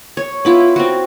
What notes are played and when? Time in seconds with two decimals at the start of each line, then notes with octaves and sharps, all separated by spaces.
0.17 C#5
0.45 B3 E4 F4
0.76 C4 F#4